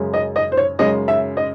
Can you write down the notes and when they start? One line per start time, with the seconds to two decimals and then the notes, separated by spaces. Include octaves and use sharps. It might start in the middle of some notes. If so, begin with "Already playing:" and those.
Already playing: F#2 C#3 G#3 C#4
0.14 D#5
0.36 D#5
0.52 C5
0.57 C#5
0.79 F#2 C#3 G#3 C#4 D#5
1.08 E5
1.37 D#5